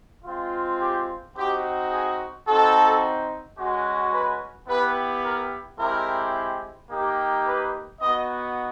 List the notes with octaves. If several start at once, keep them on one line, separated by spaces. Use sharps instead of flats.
G#3 C4 F4
G4
C4 D#4 F#4 G4
G#4
C4 D#4 F#4 A4
G#3 C#4 F#4
B4
B3 E4 G4 B4
A#4
G#3 C4 E4 G4 A#4
A#3 D#4 G4
B4
B3 D#4 F#4 D#5